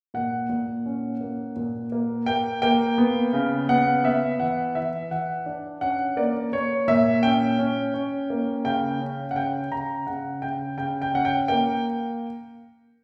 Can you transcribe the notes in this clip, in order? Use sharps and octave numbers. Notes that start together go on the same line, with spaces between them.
A#2 F#5
A#2
C#4
A#3
A#2
A#3
A#3 G5
A#3 G5
B3
C#3
B3 F#5
B3 E5
E3 F#5
E3 E5
E3 F#5
D4
C#4 F#5
A#3 D5
A#3 C#5
A#2 E5
C#4 G5
C#4
C#4
A#3
C#3 G5
C#4
F#5
C#3 G5
C#3 A#5
C#3 F#5
C#3 G5
C#3 G5
G5
C#4 F#5
G5
A#3 G5